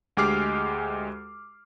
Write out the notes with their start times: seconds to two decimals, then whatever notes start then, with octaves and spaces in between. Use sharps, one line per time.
0.17 D2 G#3 G4 D6 F6 C7